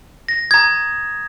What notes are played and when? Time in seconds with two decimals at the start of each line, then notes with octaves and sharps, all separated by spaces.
0.29 A#6
0.51 A#5 D#6 G#6